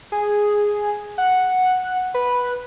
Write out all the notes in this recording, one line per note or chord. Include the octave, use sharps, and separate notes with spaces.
G#4
F#5
B4